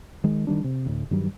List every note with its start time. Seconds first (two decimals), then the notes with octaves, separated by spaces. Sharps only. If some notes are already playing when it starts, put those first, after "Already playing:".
0.24 D#3 G#3
0.47 D#3 E3 G3 D4
0.64 C3
0.86 D2 A2
1.11 G2 D#3 F#3 G3